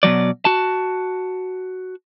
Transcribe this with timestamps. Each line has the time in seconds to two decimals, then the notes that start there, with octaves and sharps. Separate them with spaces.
0.03 B2 F3 F#3 D5
0.45 F#4 A5